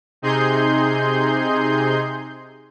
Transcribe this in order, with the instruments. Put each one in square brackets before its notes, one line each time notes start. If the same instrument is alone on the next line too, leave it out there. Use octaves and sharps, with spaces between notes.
[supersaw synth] C3 D#4 G#4 C6 G6